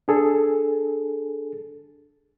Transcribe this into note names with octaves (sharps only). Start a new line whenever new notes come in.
D4 G#4 A4